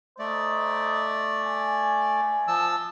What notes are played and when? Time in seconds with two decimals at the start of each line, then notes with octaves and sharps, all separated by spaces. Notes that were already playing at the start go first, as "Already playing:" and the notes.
0.19 A3 D#4 C5 D5 D#5
1.43 G#5
2.48 F3 A5 E6